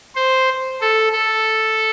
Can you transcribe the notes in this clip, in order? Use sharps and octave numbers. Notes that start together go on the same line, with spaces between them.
C5
A4
A4